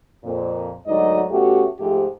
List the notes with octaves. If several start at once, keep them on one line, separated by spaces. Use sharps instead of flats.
F2 A#2
D2 G#2 F#3 D#4 D5 D#5
B2 A3 C#4 F#4 G4
G#2 F3 G#3 A3 G4